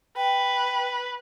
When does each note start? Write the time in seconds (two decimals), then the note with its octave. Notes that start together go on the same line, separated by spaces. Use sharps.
0.17 B4 G5